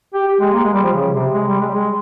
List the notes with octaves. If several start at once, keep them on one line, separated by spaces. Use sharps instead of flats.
G4
G4
G#3
A#3
G#3
G3
F3
C#3
C3
G#3
G3
G#3
G3
G#3